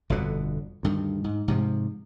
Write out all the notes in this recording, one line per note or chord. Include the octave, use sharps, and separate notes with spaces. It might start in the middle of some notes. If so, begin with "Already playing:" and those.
G1 F2 B2 D3
D2 G2 D#3
G#2
G#2 C3 F3